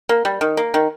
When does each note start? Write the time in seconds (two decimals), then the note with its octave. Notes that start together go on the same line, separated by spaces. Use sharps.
0.09 A#3
0.25 G3
0.41 D#3
0.57 A#3
0.74 D#3